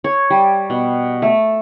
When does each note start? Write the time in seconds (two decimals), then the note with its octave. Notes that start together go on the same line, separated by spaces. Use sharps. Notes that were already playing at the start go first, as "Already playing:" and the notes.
0.04 C#5
0.30 G3
0.70 B2
1.22 A3